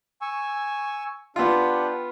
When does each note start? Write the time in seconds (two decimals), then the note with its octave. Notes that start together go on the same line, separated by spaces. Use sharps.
0.21 G#5 C#6 E6
1.36 B3 D4 F4 G4 F#5